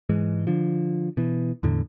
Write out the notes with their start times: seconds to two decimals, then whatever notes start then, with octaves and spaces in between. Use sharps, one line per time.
0.09 G#2 E3 G#3
0.47 D3 F3
1.17 B2 E3
1.63 E2 A2 D3